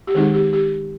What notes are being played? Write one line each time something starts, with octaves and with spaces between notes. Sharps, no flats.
G4
D#3 G#3 C4 D#4 G#4
G4
G4